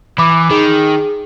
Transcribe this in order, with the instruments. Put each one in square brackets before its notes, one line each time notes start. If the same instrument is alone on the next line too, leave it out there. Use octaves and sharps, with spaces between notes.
[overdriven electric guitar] E3 [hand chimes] B5 D6
[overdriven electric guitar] D#3 [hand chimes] G#4